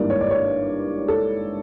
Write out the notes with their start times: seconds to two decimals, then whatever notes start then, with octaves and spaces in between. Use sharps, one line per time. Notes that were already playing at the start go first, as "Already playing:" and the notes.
Already playing: G#1 G2 E3 G3 A#3 D5
0.10 C#5
0.21 D5
0.31 C#5
1.08 A4